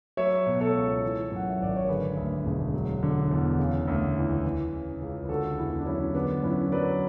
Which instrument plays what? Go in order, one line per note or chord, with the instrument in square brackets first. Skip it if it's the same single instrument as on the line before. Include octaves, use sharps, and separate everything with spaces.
[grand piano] F#3 C#5 E5
B2
A4 C#5
C#2
E3
F#2
F#5
E5
G#1 D5
C#5
D3 G#4 B4
D2
E1
F#3
D3
E2
C#3
D2
E3
E3
C#3
C#2
B4
D3 F#4 A4
E2 E4 G#4
D4
F#3 C#4 E4
D3 B3 D4
F#2 C#4 E4
F#3 B4 D5